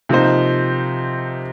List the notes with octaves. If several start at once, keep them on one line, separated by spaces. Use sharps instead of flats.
C3 F3 A#3 D#4 C5